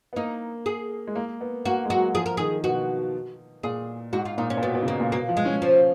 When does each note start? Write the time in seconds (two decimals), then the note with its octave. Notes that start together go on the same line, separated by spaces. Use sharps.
0.13 B3
0.16 A#3 D#4
0.66 G#4
1.07 G#3
1.15 A#3
1.41 B3
1.65 A#3 F#4
1.85 G#3
1.90 F#3 F#4
2.15 F3 G#4
2.26 A#4
2.37 D#3 G#4
2.64 B2 F#4
3.63 A#2 G#4
4.13 G#2 F#4
4.25 F4
4.38 A#2 D#4
4.50 C#4
4.57 A#2
4.62 B2 B3
4.75 B2
4.83 C#3
4.87 B2 A#3
5.00 A#2
5.12 B2 A#3
5.29 F3
5.37 G#3
5.45 C#4
5.62 F3